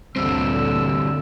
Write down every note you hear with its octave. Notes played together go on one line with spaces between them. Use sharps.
D2 G2 A#2 D3 C4 E6